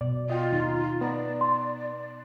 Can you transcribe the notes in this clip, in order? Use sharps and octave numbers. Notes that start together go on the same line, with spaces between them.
B2 D5
F4 D#5 G5
D#2 D#4
B3 D5 A#5
C6